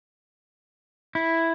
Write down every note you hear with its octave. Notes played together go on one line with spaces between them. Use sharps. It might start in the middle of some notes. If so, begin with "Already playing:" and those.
E4